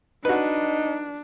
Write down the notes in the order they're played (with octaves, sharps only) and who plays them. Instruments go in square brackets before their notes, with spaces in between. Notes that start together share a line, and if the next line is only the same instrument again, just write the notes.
[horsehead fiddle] D4 [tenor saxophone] D#4 [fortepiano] F#4 B4